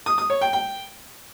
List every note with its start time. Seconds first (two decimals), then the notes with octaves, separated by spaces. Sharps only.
0.06 D#6
0.18 D#6
0.30 C#5
0.41 G5
0.53 G5